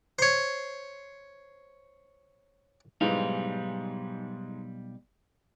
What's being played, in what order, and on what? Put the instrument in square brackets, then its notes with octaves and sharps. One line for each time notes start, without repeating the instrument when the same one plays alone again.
[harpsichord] C5 C#5
[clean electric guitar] B1 G3 F5 [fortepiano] G#2 E3 G#3